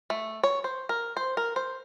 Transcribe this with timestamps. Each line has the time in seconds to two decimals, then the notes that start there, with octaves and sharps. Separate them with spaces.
0.10 A3
0.44 C#5
0.64 C5
0.89 A#4
1.17 C5
1.37 A#4
1.56 C5